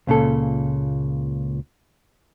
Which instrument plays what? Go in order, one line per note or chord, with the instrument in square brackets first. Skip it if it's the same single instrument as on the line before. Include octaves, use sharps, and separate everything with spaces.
[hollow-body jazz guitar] C#2 A#2 C#3 A4